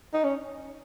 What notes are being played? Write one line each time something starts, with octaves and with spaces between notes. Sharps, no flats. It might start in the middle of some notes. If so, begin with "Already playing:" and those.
D#4
C#4